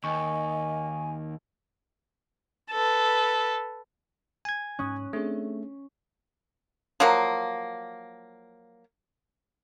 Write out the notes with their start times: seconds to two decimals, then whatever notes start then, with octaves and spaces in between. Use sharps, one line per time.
0.04 D#2 D#5 G#5 C#6
2.71 A4 B4
4.45 G#5 G#6
4.79 G#2 C#4 D#6 F#6
5.13 A3 C4 D4 G#4
7.00 F3 F#3 A#3